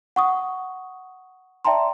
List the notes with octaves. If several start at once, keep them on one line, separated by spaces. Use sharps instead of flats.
F#5 C#6 D#6
D5 E5 G5 A5 A#5 C6